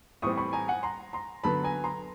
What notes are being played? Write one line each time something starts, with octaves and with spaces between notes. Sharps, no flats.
A2 E3 G3 C4 C#6 D#6
B5 C#6
G#5 A#5
F#5 G#5
A#5 C6
A#5 C6
D3 F#3 B3 A5 B5
G#5 A#5
A#5 C6